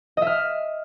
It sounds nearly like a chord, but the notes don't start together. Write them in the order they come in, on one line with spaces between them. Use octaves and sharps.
D#5 E5 F6